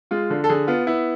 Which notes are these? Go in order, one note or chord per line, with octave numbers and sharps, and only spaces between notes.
G#3 F4
D3
A4
D3 G#4
B3 F4
B3 E4